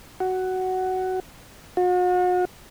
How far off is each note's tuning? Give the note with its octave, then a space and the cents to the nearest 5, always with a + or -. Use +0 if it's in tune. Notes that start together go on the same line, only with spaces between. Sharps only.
F#4 +10
F#4 -40